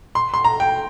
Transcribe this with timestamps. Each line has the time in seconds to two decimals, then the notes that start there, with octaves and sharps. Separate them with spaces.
0.15 C6
0.34 C6
0.44 A#5
0.60 G5